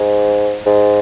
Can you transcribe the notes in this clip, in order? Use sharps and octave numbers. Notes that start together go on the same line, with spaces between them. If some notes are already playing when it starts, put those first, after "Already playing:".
Already playing: G#2
G#2